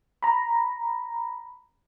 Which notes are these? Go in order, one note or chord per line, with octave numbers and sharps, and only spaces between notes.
A#5 B5